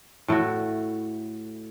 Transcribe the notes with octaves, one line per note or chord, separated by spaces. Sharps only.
A2 A3 E4 F#4